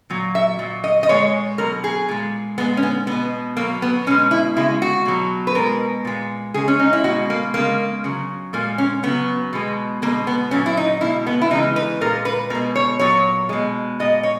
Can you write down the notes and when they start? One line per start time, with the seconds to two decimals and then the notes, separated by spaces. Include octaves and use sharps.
0.10 A#2 F#3
0.35 E5
0.59 A#2 F#3
0.84 D#5
1.03 D#5
1.09 A#2 G#3 C#5
1.58 B2 F#3 A#4
1.84 G#4
2.09 A#2 G#3
2.58 A#2 G#3 B3
2.77 C#4
2.83 B3
3.07 B2 G#3 B3
3.57 B2 F#3 A#3
3.82 B3
4.07 B2 C#4
4.11 G#3
4.31 E4
4.57 C#3 G#3 E4
4.82 F#4
5.05 B2 F#3
5.47 B4
5.55 B2 G#3 A#4
6.05 A#2 G#3
6.54 C#3 G#3 G#4
6.68 C#4
6.79 D#4
6.93 E4
7.04 B2 F#4
7.08 G#3
7.30 A#3
7.54 C#3 G#3 A#3
8.04 C#3 F#3
8.53 A#2 G#3 A#3
8.78 C#4
9.03 C#3 F#3 B3
9.53 B2 G#3
10.02 B2 A#3
10.07 G#3
10.27 B3
10.51 A#2 F#3 C#4
10.66 E4
10.77 D#4
11.01 B2 G#3 E4
11.27 B3
11.42 E4
11.51 C#3 E3 G#3 D#4
11.76 B4
12.01 A#2 A#4
12.04 G#3
12.25 B4
12.50 B2 A#4
12.55 G#3
12.76 C#5
12.99 A#2 F#3 C#5
13.49 B2 G#3
14.00 A#2 G#3 D#5
14.23 C#5